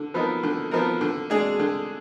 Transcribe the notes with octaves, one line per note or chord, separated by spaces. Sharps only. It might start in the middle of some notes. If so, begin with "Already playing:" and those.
Already playing: D3
F3 B3 D#4 A#4
D3
F3 B3 D#4 A#4
D3
G#3 D4 G#4
D3